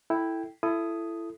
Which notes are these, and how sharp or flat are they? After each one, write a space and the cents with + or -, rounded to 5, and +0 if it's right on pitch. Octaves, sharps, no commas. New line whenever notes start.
E4 +0 A4 +0 G5 +0
E4 +25 A4 +0 D#6 +0